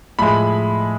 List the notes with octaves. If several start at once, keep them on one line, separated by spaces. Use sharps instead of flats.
A2 F3 G#3 B5